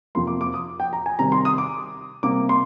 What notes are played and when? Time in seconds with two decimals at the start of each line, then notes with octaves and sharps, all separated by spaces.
0.15 F2 C3 F3 A#3 C6
0.27 D6
0.41 D6
0.54 D#6
0.80 G5
0.93 A#5
1.06 G#5
1.19 C3 D#3 G3 A#5
1.32 C6
1.45 D#6
1.58 D6
2.23 C3 G3 A#3 D6
2.49 C6